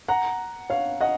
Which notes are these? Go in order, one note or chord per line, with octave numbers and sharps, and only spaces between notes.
F#5 A#5
C#5 F5
D#5 F#5